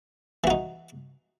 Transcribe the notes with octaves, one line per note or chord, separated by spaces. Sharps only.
E3 D#4 F#4